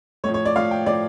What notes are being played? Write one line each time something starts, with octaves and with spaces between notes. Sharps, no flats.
A2 F3 C#5
C#5
D5
A2 F3 F5
G5
A2 F3 D5